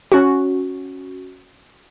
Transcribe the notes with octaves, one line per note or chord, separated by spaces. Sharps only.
C#4 F#4